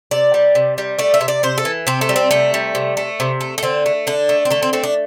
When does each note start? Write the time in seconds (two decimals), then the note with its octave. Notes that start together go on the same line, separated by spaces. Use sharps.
0.11 C3 D5
0.34 G3
0.55 C3
0.78 G3
0.99 A3 D5
1.14 E5
1.21 C3
1.28 D5
1.43 C3 C5
1.58 A4
1.65 E3
1.87 C3 C4
2.01 A3
2.09 G3
2.16 C4
2.31 C3 A3
2.54 G3
2.75 C3
2.97 A3
3.20 C3
3.41 A3
3.58 A3
3.63 D3 C4
3.86 A3
4.07 D3 D4
4.29 A3
4.45 C4
4.50 D3 A3
4.63 C4
4.73 A3 C4
4.83 D4